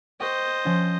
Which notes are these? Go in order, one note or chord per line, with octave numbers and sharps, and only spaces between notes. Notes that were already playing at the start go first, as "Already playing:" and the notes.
C5 D#5 G5 C#6
F3 C#4